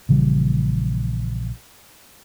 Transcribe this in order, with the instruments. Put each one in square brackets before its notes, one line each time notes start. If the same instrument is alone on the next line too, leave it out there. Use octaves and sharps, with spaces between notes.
[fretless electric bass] A#1 C#3 E3 G3